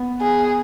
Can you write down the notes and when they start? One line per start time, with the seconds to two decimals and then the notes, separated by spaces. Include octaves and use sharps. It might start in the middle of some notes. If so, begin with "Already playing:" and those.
Already playing: B3
0.21 G#4